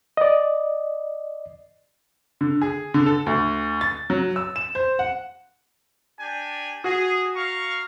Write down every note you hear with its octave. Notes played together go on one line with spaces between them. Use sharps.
D5 D#5
D3
G#4
D3
A4
D2
A6
F#3
E6
E7
C5
F#5
D4 G4 G#5
F#4 G#4
F5 A#5 C#6